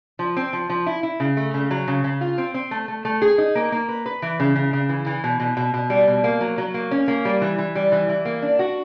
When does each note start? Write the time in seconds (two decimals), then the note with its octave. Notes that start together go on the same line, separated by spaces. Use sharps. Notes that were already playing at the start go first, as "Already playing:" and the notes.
0.19 F3
0.37 C4
0.53 F3
0.70 F3
0.86 E4
1.03 E4
1.20 C#3
1.37 A3
1.54 C#3
1.71 F#3
1.88 C#3
2.04 C#3
2.21 F4
2.38 C4
2.54 C4
2.71 A3
2.88 A3
3.05 A3
3.22 G#4
3.38 D#4
3.55 A#3
3.72 A#3
3.89 B4
4.06 B4
4.22 E3
4.40 C#3
4.56 C#3
4.73 C#3
4.89 E3
5.06 E3
5.24 B2
5.40 B2
5.57 B2
5.74 B2
5.90 G3
6.08 B2
6.24 A#3
6.41 F#3
6.58 F#3
6.74 A#3
6.91 C#4
7.08 A#3
7.25 G3
7.42 E3
7.58 E3
7.75 G3
7.92 E3
8.09 E3
8.25 A#3
8.42 D4
8.59 F#4